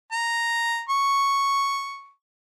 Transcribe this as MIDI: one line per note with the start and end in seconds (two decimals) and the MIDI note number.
0.12 0.83 82
0.89 2.11 85